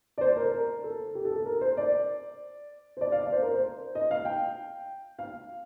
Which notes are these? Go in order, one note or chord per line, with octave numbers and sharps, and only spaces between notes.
D5
C5
A#4
A#4
A4
G4
A4
A4
A#4
C5
D5
C5
D5
F5
D5
C5
A#4
C5
D#5
F5
G5
F5